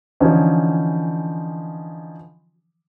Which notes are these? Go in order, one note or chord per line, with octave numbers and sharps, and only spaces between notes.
D3 E3 F3 C#4 D#4